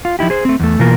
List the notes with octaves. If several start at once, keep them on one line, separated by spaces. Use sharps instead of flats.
F4
F3 D#4 E4 G4
G#4 C5
A3 C4
E2 A3
B2 E3 A#3 F4 A#4